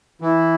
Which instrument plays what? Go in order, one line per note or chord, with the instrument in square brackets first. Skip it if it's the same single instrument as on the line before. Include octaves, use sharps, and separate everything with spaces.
[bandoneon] E3 [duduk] E4